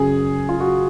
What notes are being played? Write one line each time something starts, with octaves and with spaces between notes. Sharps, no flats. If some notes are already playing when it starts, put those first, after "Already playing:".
Already playing: F#2 C#3 G#4
F4
F#4